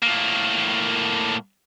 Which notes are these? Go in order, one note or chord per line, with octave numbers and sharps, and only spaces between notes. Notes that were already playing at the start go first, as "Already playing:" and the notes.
A2 A#3